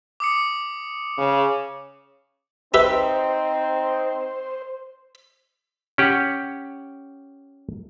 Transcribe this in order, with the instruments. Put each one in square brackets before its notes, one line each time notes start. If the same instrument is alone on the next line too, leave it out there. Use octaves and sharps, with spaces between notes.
[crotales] D6 D#6 C#7
[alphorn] C#3
[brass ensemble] C4 D#4 [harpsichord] G4 B4 E5 [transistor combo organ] C5
[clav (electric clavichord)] C#4 G4 F#5